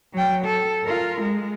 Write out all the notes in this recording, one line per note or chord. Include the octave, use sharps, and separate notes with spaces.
F#3 G5
A4
F4 A#4
G#3